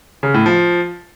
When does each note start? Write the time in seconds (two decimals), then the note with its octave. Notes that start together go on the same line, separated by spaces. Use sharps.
0.23 C#3
0.34 A2
0.46 F3